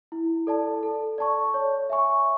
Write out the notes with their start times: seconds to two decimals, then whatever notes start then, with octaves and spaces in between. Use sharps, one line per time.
0.12 E4
0.47 A4 D5 A5
0.83 A4
1.18 D5 A5 C#6
1.54 C#5
1.90 E5 G#5 C#6